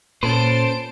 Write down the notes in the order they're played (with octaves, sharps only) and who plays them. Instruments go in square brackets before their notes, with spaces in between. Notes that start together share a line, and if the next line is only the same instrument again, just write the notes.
[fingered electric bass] A#2 [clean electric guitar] C#4 A4 B4 [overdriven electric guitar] C5 [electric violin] A5 D7